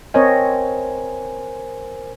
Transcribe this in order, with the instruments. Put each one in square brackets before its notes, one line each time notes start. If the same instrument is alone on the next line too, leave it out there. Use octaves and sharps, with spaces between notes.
[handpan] C4 C#5 D#5 [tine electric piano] A#4 C5 G#5